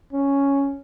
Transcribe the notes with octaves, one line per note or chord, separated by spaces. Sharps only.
C#4